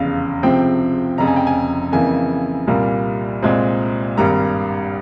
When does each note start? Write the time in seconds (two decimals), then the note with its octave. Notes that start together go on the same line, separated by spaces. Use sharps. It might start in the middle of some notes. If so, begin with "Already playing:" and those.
Already playing: F1 E2 C#3 F5
0.43 C#2 C3 F3 C4 G5
1.18 F1 F2 C#3 A#5
1.27 G#5
1.36 G5
1.47 G#5
1.92 F2 C#3 E3 A#3 G#5
2.67 C2 A#2 G3 A#3
3.43 C2 A#2 G#3 C4
4.17 G#1 G2 G3 A#3 A#5